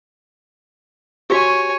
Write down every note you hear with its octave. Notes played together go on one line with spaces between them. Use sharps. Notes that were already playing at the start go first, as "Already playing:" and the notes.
F#4 G4 C#5 G#5